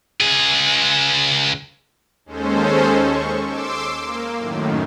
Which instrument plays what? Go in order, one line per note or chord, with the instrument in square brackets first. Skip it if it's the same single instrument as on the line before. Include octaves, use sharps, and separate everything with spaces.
[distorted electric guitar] C#2 G#4
[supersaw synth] D#2 G#3 C#4 A4 C5
C#6
C6 D6 E6
A#3
F#2 A2 D#3